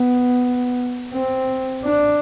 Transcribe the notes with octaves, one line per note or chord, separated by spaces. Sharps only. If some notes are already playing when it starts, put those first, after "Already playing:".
Already playing: B3
C4
D4